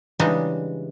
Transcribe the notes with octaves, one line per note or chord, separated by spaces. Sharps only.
C#3 E3 G3 G#3 D4 D#4